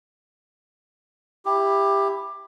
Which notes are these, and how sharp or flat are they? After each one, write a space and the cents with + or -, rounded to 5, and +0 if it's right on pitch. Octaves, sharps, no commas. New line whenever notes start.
E4 +0 G4 +15